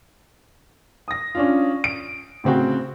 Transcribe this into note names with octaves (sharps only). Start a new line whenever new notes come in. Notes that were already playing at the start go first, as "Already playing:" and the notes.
D#6 A#6
C#4 D4 F4
D7
A2 C#3 C4 F#4 G5